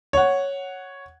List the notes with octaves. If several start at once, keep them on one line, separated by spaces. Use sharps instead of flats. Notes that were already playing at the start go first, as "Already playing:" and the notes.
C#5 F#5